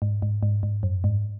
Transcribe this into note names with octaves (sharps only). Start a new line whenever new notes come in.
G#2
G#2
G#2
G#2
F#2
G#2